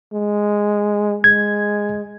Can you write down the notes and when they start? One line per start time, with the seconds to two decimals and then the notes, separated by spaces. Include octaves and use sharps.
0.14 G#3
1.24 G#3 G#6